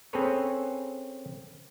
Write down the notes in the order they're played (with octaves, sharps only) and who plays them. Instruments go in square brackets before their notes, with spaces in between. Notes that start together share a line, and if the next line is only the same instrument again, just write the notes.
[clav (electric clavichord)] C4 C#4 G#4 A4 B4 C#5